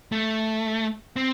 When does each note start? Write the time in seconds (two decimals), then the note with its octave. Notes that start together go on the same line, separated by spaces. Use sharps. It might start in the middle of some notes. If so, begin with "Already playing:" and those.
0.12 A3
1.16 C4